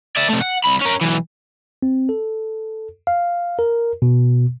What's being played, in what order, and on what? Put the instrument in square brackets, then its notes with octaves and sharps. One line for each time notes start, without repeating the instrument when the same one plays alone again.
[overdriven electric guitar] D5 E5
C3 A3
F#5
C2 B5
C#4 A#4
B1 E3
[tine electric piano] C4
A4
F5
A#4
B2